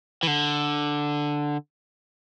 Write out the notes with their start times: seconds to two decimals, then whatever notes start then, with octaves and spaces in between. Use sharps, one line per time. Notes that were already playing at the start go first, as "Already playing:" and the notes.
0.23 E3
0.27 D3